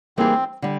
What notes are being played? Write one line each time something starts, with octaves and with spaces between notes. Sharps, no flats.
E3 G3 A#3 C4 D#4 G#4
D3 G3